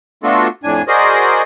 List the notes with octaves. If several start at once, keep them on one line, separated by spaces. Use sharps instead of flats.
A3 B3 D4 F4 F#4 A4
F2 A2 D4 G#5
F#4 G#4 A#4 C5 D5 D#5